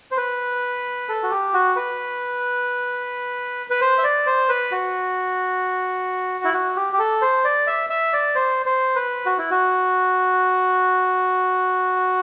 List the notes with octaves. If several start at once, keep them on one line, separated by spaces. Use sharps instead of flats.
C5
B4
A4
F#4
G4
F#4
B4
B4
C5
E5
D5
C5
B4
F#4
E4
F#4
G4
G4
A4
C5
D5
E5
E5
D5
C5
C5
B4
F#4
E4
F#4